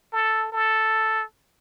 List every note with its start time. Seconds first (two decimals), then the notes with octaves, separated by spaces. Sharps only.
0.13 A4
0.53 A4